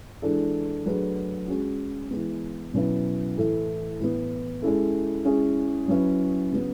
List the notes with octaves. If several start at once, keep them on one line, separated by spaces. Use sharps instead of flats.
E3 G#3 D4 A4
F#3 A3 D4 G#4 B4
G#3 C#4 F#4
E3 G#3 B3
B2 F#3 C#4 E4 B4
A2 E3 A3 E4 A4
A2 E3 B3
G#3 C#4 E4 A4
G#3 C#4 E4 G#4
F#3 C#4 E4 B4
C#3 F#3 B3